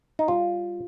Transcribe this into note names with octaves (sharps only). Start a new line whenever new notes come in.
D#4
G3 F4